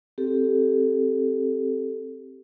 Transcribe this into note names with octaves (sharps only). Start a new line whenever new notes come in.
C4 G4 A4